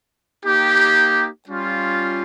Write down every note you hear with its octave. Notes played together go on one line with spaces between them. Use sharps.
A#3 D#4 G4
G3 C#4 F4